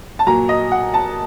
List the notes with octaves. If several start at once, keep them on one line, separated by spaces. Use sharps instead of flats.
A5
A#2 F#3 A#5
D#5
F#5
A5